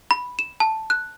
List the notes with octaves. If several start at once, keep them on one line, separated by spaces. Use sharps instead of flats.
B5
E7
A5
F#6